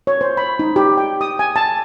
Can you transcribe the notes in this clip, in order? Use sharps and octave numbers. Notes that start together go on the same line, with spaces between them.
C#5
C5
B5
D#4
G4
G5
D#6
G#5
A5